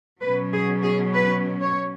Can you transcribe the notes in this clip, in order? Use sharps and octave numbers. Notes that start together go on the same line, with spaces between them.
B2 F#3 C#4 B4
G#4
G#4
B4
C#5